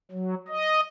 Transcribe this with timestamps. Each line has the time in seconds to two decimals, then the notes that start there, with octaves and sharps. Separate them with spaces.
0.11 F#3
0.48 D#5